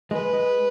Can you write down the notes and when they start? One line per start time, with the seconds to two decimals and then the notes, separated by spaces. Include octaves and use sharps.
0.11 G#3 B4
0.33 G#3